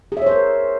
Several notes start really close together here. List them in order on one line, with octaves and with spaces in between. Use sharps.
G#4 E5 C#5 C5 A#4